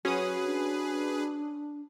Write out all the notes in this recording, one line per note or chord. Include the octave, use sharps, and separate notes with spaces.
F#3 C#4 F#4 G#4 B4 D#6
D4